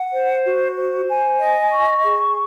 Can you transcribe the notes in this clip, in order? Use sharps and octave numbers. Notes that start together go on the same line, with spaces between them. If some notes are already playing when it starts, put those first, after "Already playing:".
Already playing: F#5
C5
F#4
C5
G#5
D#5
C#6
G#4